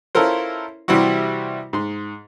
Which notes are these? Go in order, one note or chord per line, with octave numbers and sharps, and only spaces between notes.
C#4 E4 F4 A4 A#4 C5
C3 E3 G3 C4 E4 F#4
G#2 C6